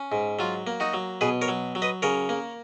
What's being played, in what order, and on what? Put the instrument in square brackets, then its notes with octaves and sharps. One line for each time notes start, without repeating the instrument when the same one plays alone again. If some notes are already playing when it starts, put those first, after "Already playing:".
Already playing: [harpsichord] C#4
G#2
F#3 F4
A#3
D#4 F#4
F#3
B2 G#4 B4
A#4 C#5
F#3
F#3
B4 D#5
C#3 A#4 C#5
A#3